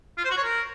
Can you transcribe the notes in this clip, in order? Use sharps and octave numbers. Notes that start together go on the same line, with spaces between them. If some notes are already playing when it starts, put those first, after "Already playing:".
F4
C5
F#4
C#5
A#4